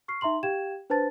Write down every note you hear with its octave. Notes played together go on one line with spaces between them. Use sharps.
C#6 F6 C7
D#4 E5 A#5 C6 F#7
G4 F5 G5 G#6 E7
D4 B4 C5 A5 A6